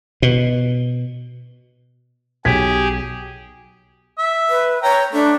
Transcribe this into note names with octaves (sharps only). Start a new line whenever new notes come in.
B2
B1 G4 G#4 G#6 B6
E5
B4
C#5 G5 A#5
A3 D4